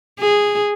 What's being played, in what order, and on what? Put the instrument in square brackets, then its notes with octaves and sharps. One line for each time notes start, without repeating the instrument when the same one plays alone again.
[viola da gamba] G#4